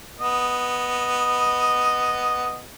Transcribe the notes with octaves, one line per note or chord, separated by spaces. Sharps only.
B3 D#5